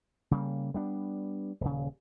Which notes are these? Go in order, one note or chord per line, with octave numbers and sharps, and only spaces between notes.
C#3 G3 A#3
G3 B3 D4
D#1 C#3